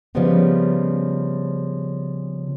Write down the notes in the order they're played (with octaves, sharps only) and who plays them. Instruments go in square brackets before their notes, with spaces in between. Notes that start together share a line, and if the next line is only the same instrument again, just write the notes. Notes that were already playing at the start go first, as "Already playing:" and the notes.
[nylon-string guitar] C#3 F3 G3 G#3 B3 C4